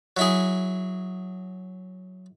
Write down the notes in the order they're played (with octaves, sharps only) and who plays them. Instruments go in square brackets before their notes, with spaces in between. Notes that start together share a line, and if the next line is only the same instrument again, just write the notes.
[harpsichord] F#3 E4 G#4